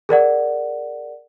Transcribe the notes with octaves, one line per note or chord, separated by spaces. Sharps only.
G#4 A#4 D5 F#5